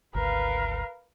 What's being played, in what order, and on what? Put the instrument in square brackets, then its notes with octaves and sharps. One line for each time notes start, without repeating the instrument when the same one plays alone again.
[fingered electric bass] G#1 D2 [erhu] A#4 [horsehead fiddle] B4 F5